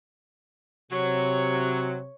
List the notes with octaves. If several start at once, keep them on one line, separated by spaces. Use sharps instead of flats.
C3 F#3 C#5